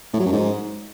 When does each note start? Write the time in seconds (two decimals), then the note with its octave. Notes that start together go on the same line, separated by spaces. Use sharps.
0.14 A2
0.20 F#3
0.26 F#2
0.33 G#2